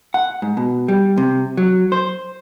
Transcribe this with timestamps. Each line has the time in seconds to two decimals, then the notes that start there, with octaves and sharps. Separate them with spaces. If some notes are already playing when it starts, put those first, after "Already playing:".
0.14 F#5
0.42 G#2
0.57 B2
0.88 G3
1.18 C3
1.57 F#3
1.92 C5